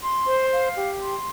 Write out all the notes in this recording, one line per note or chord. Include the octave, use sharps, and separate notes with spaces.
C6
C5
F5
G4
C6